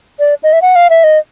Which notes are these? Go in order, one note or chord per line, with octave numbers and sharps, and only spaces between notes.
D5
D#5
E5
F#5
F5
E5
D#5